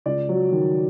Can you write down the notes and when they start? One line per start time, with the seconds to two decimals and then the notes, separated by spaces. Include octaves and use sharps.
0.06 C#2 D5
0.29 F#3
0.52 D#3